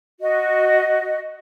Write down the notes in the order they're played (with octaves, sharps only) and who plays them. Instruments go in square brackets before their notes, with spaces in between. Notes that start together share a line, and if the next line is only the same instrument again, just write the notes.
[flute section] F#4 D#5